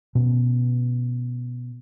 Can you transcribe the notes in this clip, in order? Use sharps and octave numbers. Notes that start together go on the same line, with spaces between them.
B2 C#4